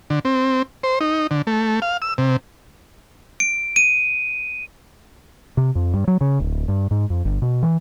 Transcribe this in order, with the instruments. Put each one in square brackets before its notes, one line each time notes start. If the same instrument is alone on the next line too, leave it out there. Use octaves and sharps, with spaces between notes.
[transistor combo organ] D3
C4
C5
D#4
D3
A3
F5
E6
C3
[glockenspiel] D7
D#7
[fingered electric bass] C3
F2
G2
F#3
C#3
D1
G2
G#2
F2
G1
B2
E3